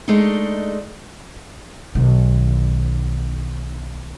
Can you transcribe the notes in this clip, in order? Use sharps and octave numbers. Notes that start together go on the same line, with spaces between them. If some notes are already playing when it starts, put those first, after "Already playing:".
G#3 A3 D4 D#4
B1 D#3